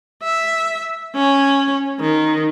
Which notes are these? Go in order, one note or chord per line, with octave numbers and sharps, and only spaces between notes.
E5
C#4
D#3